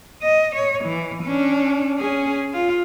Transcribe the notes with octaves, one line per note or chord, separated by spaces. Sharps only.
D#5
C#5
E3
C#4 D4
C#4 G#4
F4